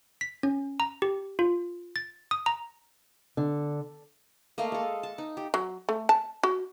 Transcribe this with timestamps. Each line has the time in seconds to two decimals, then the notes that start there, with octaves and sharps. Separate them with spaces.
0.21 B6
0.43 C#4
0.80 A#5
1.02 G4
1.39 F4
1.96 A6
2.31 D#6
2.46 A#5
3.37 D3
4.58 A3 A#3 D#5 F5
4.72 G#3 A4
5.03 A5
5.18 D#4
5.37 G4
5.54 F#3
5.89 A3
6.09 A5
6.43 F#4